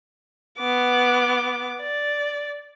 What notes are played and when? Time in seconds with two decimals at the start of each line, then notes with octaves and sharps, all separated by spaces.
0.58 B3 D6
1.81 D5